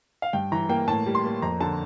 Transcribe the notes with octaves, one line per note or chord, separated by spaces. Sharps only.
F5
G2 G5
E3 A#5
A#3 G5
A2 A5
G3
C6
A#3
F2 A#5
D3 A5